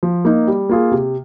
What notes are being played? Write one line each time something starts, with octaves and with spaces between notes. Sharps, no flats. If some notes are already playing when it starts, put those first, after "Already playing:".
F3
A#3 D#4
G3
A#3 F4 G#4
C3